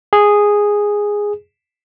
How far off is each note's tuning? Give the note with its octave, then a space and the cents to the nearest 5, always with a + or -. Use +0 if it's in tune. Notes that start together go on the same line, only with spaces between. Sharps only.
G#4 -5